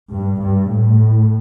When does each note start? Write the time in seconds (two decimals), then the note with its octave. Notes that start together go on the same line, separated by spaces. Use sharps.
0.13 G2
0.44 G2
0.74 A2